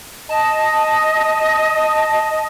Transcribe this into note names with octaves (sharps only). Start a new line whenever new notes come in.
D#5 A5